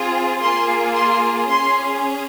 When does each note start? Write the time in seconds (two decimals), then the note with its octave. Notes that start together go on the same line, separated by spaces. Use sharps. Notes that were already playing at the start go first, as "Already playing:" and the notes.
Already playing: C4 F4 G#4
0.40 A#3 F4 G#4 C6
0.95 C6
1.49 C#4 G#4 C6